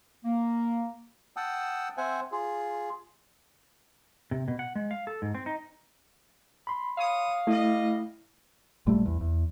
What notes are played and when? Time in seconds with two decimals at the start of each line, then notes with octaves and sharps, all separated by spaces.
0.25 A#3
1.36 F#5 G5 A5 D#6 E6
1.97 C4 C5 E5 F#5 G#5
2.32 F4 G#4
4.31 C3
4.48 B2
4.59 F#5
4.76 G#3
4.91 F5
5.07 A4
5.22 G#2
5.35 C4
5.46 D#4
6.67 B5 C6
6.97 C#5 F5 D#6
7.47 G3 A3 E4 D#5
8.87 A#1 G3 A3
9.06 E2
9.21 E2